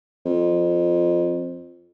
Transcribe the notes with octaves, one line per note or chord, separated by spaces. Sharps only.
F2